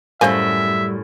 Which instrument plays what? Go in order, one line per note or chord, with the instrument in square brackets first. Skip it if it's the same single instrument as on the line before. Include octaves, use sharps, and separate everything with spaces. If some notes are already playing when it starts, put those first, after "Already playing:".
[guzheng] F#2 A2 [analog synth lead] G3 [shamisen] C5 F5 G#5 [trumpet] E5